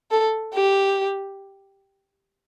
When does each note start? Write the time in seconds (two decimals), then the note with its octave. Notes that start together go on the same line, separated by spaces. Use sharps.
0.11 A4
0.54 G4